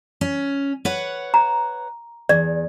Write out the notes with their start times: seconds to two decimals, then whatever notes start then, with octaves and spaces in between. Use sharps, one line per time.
0.21 C#4
0.85 B4 C#5 F#5
1.34 A#5
2.29 E2 D5